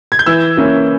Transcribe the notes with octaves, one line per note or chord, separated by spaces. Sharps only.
G#6
G6
E3 E6
A#3 C#4 E4